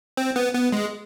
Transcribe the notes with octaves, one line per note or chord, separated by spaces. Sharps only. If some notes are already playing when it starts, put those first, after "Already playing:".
C4
B3
B3
G#3